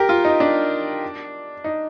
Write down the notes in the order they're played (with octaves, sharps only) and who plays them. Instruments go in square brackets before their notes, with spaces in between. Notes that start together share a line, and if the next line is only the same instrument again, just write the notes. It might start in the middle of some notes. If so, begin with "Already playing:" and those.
Already playing: [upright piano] G4 A#4
F4
D#4
D4
D#4